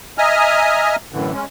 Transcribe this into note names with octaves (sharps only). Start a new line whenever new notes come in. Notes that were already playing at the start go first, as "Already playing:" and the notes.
D#5 E5 G#5 A#5 D#6 F6
F#2 A2 D3 E3
G#3 C#4